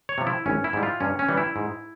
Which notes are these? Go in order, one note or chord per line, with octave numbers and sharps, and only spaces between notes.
C#5
C3 F3
E4
G#1 C#4
E4
G#2 G3
F4
G2 C#4
C#4
E3 G3
E4
G#2